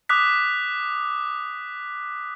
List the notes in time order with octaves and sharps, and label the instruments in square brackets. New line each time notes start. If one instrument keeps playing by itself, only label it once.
[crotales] D6 D#6 F#6 B6